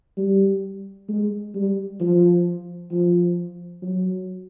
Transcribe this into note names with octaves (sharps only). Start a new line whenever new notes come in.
G3
G#3
G3
F3
F3
F#3